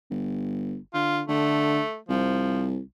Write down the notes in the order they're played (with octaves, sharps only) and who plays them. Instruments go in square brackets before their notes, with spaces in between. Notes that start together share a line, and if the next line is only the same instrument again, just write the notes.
[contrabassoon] G1
[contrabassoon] D3 [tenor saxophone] F4
[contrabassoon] D3 [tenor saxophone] A3
[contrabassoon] C2 [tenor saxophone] F3